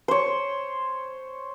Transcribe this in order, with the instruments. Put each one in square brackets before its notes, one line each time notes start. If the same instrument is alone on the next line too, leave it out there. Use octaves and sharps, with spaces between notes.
[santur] C5 C#5